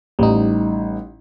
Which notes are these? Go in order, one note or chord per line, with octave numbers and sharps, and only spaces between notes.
A1 G3 D#4